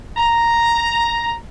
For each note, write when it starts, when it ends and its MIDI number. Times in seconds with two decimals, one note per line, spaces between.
0.17 1.33 82